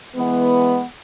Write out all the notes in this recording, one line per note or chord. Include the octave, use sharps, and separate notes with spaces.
E3 G#3 B3